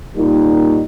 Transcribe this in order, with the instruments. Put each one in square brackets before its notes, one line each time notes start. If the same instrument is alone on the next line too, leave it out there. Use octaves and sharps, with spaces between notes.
[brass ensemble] A#2 G3 A#3 D#4